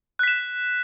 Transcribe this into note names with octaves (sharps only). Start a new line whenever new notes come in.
F#6 B6 E7